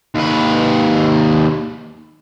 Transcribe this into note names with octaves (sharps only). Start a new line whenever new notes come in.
D#2 B4